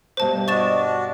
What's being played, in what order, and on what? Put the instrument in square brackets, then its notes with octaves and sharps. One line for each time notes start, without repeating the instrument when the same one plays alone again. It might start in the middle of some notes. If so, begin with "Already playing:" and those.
[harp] G2 B2 B4 [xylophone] C5 A5
[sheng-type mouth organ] D4 F#4 [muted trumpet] D#5 [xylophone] C#6 A6 E7